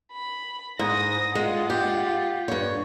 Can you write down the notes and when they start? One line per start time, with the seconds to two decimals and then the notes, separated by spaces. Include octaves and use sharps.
0.13 B5
0.79 G#2 D#6 A#6
1.35 G#3 F4 F#5
1.70 G4
2.48 G2 C#5